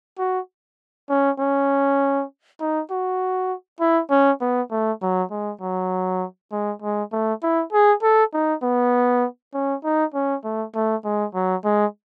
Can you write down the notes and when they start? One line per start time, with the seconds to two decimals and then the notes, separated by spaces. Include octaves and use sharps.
0.18 F#4
1.10 C#4
1.39 C#4
2.60 D#4
2.91 F#4
3.80 E4
4.10 C#4
4.41 B3
4.71 A3
5.02 F#3
5.31 G#3
5.61 F#3
6.52 G#3
6.82 G#3
7.12 A3
7.43 E4
7.73 G#4
8.03 A4
8.33 D#4
8.63 B3
9.54 C#4
9.84 D#4
10.14 C#4
10.44 A3
10.75 A3
11.05 G#3
11.34 F#3
11.64 G#3